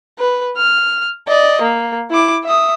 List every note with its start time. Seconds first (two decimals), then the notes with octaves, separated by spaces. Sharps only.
0.19 B4
0.58 F6
1.28 D5 D#5
1.62 A#3
2.10 E4 D6
2.44 E5 D#6